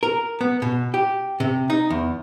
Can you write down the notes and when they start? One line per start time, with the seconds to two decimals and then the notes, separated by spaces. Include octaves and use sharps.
0.03 A#4
0.41 B3
0.62 B2
0.94 G4
1.40 C3
1.70 D#4
1.90 E2